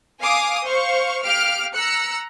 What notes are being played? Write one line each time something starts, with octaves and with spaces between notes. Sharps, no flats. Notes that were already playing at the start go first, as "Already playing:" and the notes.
F5 G#5 D6 D#6
C5 F5 C#6
G4 F5 F6 D7
A#5 E6 F#6 C#7